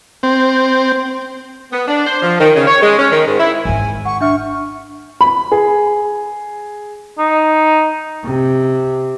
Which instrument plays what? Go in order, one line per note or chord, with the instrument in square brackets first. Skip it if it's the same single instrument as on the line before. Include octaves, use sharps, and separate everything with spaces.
[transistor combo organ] C4
[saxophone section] B3
D4
C5
F3
D#3
C#3
C#5
G#3
C#4
D#3
G#2
E4
[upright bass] G#1 D#3 [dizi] G#5
[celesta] F#5 [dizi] C#6
[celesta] D4 E5 F6 [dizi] C#6
[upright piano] B5
G#4
[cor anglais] D#4
[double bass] C3